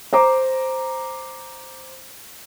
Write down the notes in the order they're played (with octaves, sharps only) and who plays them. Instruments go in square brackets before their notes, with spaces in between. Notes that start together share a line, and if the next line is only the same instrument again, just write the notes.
[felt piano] C5 A#5 D6